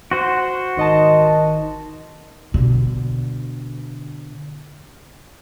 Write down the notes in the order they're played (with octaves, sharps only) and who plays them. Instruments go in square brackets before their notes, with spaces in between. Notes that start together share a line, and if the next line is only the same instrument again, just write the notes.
[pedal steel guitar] F#4 C5 F#5
[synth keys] G#1 D#5 A5 [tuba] D#3
[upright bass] B2 D3